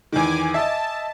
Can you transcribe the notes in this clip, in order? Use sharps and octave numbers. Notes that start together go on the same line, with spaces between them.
E2 D#3 G#5 D6
D#5 E5 A5